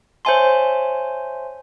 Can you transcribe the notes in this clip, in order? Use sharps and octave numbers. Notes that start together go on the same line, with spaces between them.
C5 C#5 E5 G#5 A5 C6